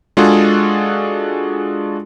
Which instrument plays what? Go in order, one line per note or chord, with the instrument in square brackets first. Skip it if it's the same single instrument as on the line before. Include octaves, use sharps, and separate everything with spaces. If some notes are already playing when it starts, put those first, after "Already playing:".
[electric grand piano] G#3 D4 F4 F#4 G#4 A4